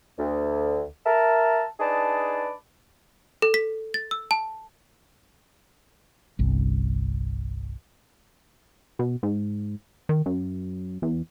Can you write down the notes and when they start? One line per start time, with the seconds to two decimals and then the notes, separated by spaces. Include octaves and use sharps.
0.18 D2
1.05 A#4 E5 A5
1.80 D4 D#4 G#4 B4 D5 A5
3.42 A4
3.54 B6
3.94 A6
4.11 E6
4.31 A5
6.39 G1 C2
8.99 B2
9.23 G#2
10.09 D#3
10.26 F#2
11.02 E2